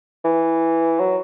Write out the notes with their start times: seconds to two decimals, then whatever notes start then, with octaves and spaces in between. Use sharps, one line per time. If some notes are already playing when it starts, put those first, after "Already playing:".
0.24 E3
1.00 F#3